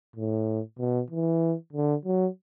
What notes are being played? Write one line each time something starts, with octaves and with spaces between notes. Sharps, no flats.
A2
B2
E3
D3
F#3